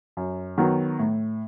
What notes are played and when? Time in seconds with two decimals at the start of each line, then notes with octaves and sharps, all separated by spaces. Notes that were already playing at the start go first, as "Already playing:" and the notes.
0.17 F#2
0.58 D#3 F#3 B3
0.99 A2